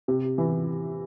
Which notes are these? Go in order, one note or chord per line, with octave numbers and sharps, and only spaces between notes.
C3
E3